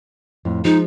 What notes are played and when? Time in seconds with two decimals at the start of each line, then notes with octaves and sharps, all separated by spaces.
0.45 F2 A2
0.65 F3 G#3 D#4